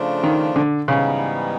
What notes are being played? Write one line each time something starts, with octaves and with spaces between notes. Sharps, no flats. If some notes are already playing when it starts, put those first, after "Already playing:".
Already playing: C#3 F3 A3 D4 F4
D#3
D3
G#2 C#3 E3 G3 B3 D#4